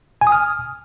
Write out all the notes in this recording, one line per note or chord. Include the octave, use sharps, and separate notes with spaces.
G#5
D#6
F6